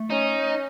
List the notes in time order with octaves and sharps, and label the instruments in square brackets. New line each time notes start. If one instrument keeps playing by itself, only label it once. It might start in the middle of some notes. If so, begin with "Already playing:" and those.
Already playing: [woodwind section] A3
[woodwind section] C#4 [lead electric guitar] D#4